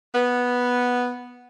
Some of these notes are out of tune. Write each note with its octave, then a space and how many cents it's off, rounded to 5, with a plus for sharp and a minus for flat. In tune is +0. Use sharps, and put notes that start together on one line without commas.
B3 -5